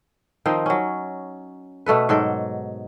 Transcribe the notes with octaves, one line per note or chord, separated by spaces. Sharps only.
D#3 F3 C4 D#4
F#3 C#4
B2 A3 A4 B4
G#2 F#3 A4 G5